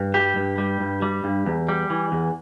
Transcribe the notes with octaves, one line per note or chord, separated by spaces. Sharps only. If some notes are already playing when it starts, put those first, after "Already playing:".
Already playing: G2
G3 G4
G2
G3
G2
G3
G2
E2
G3
E3
E2